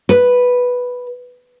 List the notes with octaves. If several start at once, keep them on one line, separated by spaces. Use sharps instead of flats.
B4